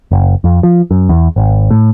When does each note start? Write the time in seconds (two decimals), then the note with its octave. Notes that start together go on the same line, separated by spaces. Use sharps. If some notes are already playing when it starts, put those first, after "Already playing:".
0.11 F#1
0.44 F2
0.63 F3
0.91 F#2
1.09 E2
1.36 G#1
1.71 A2